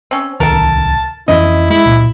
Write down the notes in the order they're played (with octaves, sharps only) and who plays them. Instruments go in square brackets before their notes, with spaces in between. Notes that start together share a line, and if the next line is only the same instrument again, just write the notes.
[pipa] C4 C#4
[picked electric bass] D1 C2 D#3 [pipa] A4 A#4 [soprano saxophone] A5
[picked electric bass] F2 E3 C#4 [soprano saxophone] E4 [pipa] D#5
[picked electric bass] G#3 [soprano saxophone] E4
[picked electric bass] C#2 A#2